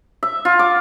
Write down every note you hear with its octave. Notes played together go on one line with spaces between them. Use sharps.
E5
F4
D6